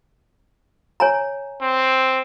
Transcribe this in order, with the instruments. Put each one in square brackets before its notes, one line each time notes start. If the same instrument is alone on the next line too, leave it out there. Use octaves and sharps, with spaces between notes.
[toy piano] C#5 G#5 A#5
[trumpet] C4